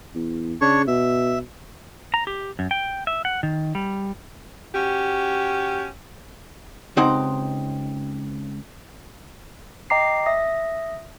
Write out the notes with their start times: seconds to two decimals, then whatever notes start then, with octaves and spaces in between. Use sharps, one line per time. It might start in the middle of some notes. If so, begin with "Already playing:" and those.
0.15 E2
0.61 C#3 D4 C#5 C#6
0.87 B2 E5
2.14 A#5
2.27 G4
2.59 F#2
2.71 G5
3.07 E5
3.25 F#5
3.43 D#3
3.75 G3
4.74 C#4 F#4 G4
6.97 C#2 C4 D#4 G4 F#5 C6
9.90 D#5 G5 A#5 D6 C7
10.26 E5 D#6 A#6